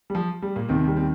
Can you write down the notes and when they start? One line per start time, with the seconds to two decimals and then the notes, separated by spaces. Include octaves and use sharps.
0.10 G3
0.15 F3
0.42 G3
0.56 A#2 A#3
0.69 D#2 C3 D#3 C4
0.87 G3
0.96 C4